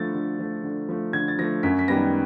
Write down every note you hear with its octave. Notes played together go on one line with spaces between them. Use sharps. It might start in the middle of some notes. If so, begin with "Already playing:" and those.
Already playing: D3 F3 A3 A6
D3
F3 A3
D3
F3 A3
D3 G#6
A6
F3 A3 A#6
F#2 B6
B6
D#3 G3 B3 A#6